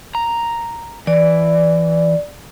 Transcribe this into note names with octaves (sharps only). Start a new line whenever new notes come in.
A#5
E3 D5